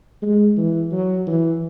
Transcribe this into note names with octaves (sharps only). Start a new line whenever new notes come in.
G#3
E3
F#3
E3